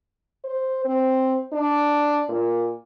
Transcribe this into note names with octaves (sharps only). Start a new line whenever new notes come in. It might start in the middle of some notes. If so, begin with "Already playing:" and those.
C5
C4
D4
A#2